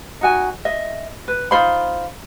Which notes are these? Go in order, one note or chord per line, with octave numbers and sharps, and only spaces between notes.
D#4 F#4 G#5
D#5 E5
B4
D#4 F4 C5 B5